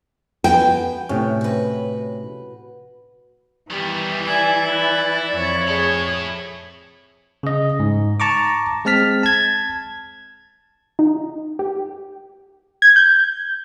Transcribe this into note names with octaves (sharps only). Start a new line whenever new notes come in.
B3 F#4 B4 G5 G#5
A2 C3 A3 C#4
F#4 B4
D#3 E3 G3 B3
E4 D5 G#5
B4
F2 C#5
E4 G#4 A4
C#3 D#5
G#2
A5 A#5 C#6 D6
G#3 C4 A5 F6 B6
A5 G#6
D#4
G4
G#6
G6